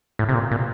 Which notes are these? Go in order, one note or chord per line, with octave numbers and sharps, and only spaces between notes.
A2
C3
A#2
A#2